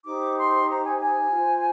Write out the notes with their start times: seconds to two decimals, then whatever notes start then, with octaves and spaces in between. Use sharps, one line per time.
0.05 D#4 G4 C5 D6
0.37 C6
0.68 A#5
0.84 G#5
0.99 G#5
1.30 F4 C5